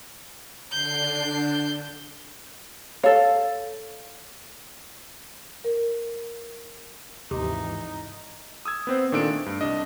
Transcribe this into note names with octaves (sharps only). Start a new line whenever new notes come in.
D3 D4 G6 C7
A4 C#5 F5
A#4
G#1 D#2 C3 E3 G#3 D#4
D#6 E6 G#6
B3 C4 C5
A#2 D#3 D4 A4 D7
A3
G2
C2 D4 D#5